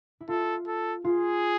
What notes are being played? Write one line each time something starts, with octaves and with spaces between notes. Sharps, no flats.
E4
F4 A4
A4
F4 G#4